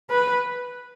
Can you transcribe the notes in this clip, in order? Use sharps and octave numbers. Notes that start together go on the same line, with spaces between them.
B4